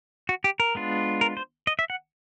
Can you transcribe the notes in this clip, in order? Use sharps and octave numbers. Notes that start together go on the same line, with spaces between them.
F#4
G4
A#4
G#3 B3 D4 F4
A#4
C5
D#5
E5
F#5